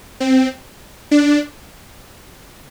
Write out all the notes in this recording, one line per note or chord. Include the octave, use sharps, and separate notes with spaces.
C4
D4